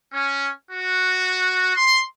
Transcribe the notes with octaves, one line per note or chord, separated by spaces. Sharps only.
C#4
F#4
C6